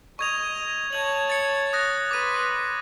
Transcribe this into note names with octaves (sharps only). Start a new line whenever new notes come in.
D#5 C#6 G#6 F7
C#5 A5 G#6 F#7
A6 C#7
D#6 F#6 A#6
B4 C6 D6 D#7